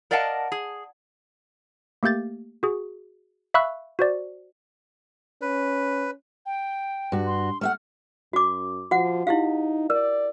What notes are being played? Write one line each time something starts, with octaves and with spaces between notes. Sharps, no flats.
A#4 D5 D#5 F5 F#5 A5
G#4
A3 A#3 G4 G6 A6
F#4 G#4
E5 F5 B5 C#6 E6 F#6
F#4 C5 D5
C#4 B4
G5
G2 F#4
C6
A3 E5 F#5 F6
F#2 F#4 D6
F3 F#4 F#5
D#4 E4 G4 F5
A#4 D5